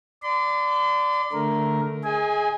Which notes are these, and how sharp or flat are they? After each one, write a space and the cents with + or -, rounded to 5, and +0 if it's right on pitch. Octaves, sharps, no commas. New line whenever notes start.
D5 +0 C6 -40
D3 +0 A3 +0 A#4 +0
G#4 +10 D#5 +35 G#5 -15